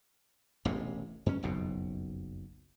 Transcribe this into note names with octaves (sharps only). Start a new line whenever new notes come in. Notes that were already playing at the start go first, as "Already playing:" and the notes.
E1 A1 A2 C3
G2 C#4
F#1 B1 F2 B2